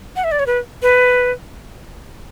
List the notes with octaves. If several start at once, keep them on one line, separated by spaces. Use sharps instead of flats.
F#5
E5
D5
C#5
B4
B4